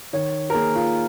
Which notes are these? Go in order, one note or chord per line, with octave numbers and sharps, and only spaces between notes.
D#3 C#5
A#4
A#3 G#4
F4